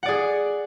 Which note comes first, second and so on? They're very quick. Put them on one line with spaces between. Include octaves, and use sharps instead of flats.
F#5 D5 G#4